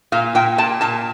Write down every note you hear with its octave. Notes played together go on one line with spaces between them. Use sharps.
A#2 F5
A#2 G5
A#2 A5
A#2 A5